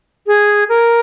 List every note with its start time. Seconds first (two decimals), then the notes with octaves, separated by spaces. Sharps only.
0.27 G#4
0.69 A#4